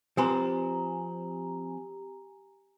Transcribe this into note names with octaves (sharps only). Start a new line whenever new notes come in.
F3 C4 G4 B4 G#5 A#5